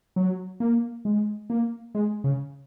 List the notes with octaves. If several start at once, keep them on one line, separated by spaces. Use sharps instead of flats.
F#3
A#3
G#3
A#3
G#3
C#3